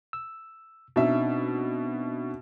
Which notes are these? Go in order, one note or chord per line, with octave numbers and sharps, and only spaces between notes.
E6
B2 C4 D4 D#4 E5